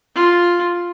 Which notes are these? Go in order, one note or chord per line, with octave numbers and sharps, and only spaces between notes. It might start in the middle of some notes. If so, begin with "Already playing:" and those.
F4